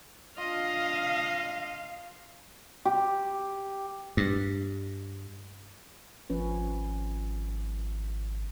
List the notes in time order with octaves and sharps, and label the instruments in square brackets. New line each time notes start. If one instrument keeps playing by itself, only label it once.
[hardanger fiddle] D4 D#5 [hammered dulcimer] F4 [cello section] F5
[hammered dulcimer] G4
[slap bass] G2
[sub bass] G#1 [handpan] F3 C#4 B4